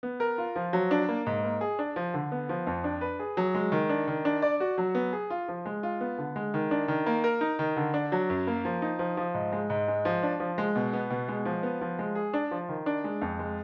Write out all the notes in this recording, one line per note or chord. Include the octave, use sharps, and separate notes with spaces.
B3
A#4
F4
F3
F#3
D4
A#3
G#2
A#3
G#4
D4
F3
D3
B3
F3
F2
D4
B4
G#4
F#3
G#3
D#3
D4
D#3
D4
D5
F#4
F#3
B3
G#4
F4
F3
G#3
F4
B3
D3
G#3
D#3
D4
D#3
A#3
A#4
D#4
D#3
D3
D4
F#3
F#2
A#3
F3
D#4
F3
F3
G#2
G#3
G#2
G#3
F3
D4
F3
G#3
B2
B3
B2
G#3
F3
B3
F3
G#3
G#4
D4
F3
D#3
D4
G#3
F2
G#3